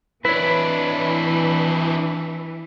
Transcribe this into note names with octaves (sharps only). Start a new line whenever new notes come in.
E3 D4 E4 B4 C#5